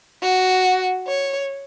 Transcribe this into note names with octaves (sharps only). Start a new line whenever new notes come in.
F#4
C#5